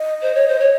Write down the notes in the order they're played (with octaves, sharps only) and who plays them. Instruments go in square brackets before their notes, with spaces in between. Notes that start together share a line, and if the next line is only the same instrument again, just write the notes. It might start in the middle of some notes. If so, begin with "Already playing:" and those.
Already playing: [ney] D#5
[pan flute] C5
C#5
C5
C#5